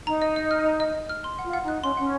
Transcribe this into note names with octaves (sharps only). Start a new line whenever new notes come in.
D#4 A#5
D#5
D#5
F6
A#5
D#5
D#5
F6
C6
F#5
F4
F#5
D#4 F#6
C#4 C6
C#4 F#5